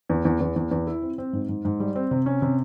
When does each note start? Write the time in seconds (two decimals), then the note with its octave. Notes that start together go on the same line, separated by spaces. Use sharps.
0.09 E2
0.25 E2
0.40 E2
0.56 E2
0.71 E2
0.87 E4
1.02 C4
1.18 C4
1.33 G#2
1.49 G#2
1.65 G#2
1.80 G3
1.95 C4
2.11 C3
2.26 C#4
2.42 C3